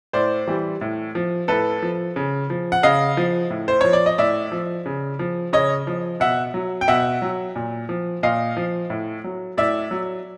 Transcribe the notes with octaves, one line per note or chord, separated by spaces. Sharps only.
A2 C5 D5
E3 G3
A2
F3
A2 A4 B4
F3
C#3
F3
F#5
C#3 D#5 F5
F3
A2
C5
F3 C#5
D5
D#5
A2 D5 E5
F3
C#3
F3
C#3 C#5 D#5
F3
B2 E5 F#5
F#3
G5
B2 E5 F#5
F#3
A#2
F3
A#2 D#5 F5
F3
A2
F#3
A2 D5 E5
F#3